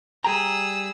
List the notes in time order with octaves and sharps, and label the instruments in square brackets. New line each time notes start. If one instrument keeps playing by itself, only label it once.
[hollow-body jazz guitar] G3 G5 A#5 [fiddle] G#4 E6